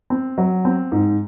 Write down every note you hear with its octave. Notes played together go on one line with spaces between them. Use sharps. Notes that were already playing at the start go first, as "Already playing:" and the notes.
C4
F#3
C4
G#2